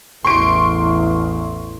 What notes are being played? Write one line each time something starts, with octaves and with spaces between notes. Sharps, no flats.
A1 E2 C6 C#6 D7